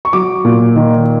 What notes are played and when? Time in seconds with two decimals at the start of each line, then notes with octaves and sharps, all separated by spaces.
0.05 C#6
0.13 F#3 D6
0.45 A#2
0.76 D#3